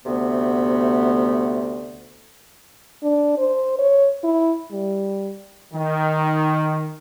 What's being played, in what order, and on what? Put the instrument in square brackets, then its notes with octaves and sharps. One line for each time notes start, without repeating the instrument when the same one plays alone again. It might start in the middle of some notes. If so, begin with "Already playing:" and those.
[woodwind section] D2 C3 A3 B3
[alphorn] D4
C5
C#5
E4
G3
[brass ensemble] D#3